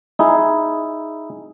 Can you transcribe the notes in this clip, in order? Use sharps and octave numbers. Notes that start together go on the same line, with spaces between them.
D#4 E4 G#4